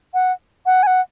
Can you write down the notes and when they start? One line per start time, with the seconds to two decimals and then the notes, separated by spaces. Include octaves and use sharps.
0.14 F#5
0.66 F#5
0.83 G#5
0.87 F#5